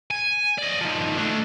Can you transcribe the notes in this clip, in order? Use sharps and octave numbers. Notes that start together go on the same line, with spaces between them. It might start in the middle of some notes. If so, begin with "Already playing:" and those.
G#5
D5 D#5
D#3 F3
A3 D4